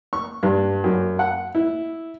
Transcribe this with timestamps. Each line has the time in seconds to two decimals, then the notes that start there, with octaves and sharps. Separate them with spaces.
0.13 C#6
0.43 G2
0.84 F#2
1.19 F#5
1.55 E4